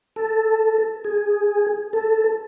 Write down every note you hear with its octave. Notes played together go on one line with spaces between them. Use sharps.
A4
G#4
A4